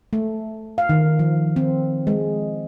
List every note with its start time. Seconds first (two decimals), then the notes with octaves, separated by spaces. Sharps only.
0.13 A3
0.78 F5
0.89 D#3
1.19 F3
1.56 C4
2.07 G#3